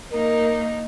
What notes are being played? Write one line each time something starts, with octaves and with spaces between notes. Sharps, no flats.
A#3 D#4 A#4